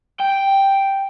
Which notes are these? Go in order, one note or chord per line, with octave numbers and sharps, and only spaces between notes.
G5